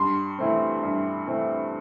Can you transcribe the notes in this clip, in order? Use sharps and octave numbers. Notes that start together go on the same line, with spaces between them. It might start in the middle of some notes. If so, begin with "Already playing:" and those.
Already playing: G2 C6
E3 A3 C4
G2
E3 A3 C4